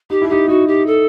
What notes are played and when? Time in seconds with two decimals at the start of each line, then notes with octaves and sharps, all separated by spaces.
0.10 D#4 G4
0.22 E4
0.29 D#4 G4
0.48 D#4 F#4
0.68 G4
0.87 A4